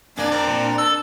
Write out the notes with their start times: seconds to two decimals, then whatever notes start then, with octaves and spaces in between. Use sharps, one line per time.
0.18 F2 A#3 D4 D5 G#5
0.31 C4 A#4
0.47 A#2
0.78 A4 E6